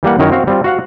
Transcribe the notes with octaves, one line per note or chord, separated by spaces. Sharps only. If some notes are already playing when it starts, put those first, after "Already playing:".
E3 G3 A#3 F#5
F#2 D#3 E4 A#4 C#5
C4 F#4 F5
G3 C4 F4
F#4 F5 F#5